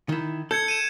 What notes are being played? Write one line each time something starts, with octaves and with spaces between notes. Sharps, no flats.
D#3 E4
A4 G6 G#6 C#7
D#7 E7